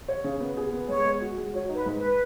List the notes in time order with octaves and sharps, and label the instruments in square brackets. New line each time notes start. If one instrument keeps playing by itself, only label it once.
[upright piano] C#5
C#3
B3
G#4
B3
[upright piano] G#3 [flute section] C#5
[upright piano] G#3
F#4
G#3
[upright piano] F#4 [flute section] C#5
[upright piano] D#4
[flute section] B4
[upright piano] G#2
[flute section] B4